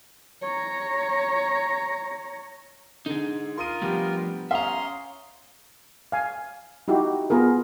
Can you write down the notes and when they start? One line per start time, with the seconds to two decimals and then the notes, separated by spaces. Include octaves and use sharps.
0.42 C#5 A#5
3.06 D3 D#4 G#4
3.58 F4 A#4 C6 D#6 D#7
3.82 F3 G3 A3 B3 G4
4.51 C#4 E5 F5 A#5 C6 D#6
6.12 F5 G#5
6.88 D#4 E4 F#4 G4
7.30 B3 F4 G#4 A#4